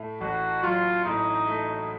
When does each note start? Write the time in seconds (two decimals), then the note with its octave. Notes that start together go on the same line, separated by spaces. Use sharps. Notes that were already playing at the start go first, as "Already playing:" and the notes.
Already playing: A2 A3
0.21 A1 F#4
0.63 F#3 F4
1.05 A2 D#4
1.47 A3